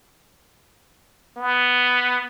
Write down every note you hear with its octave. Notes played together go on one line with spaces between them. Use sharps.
B3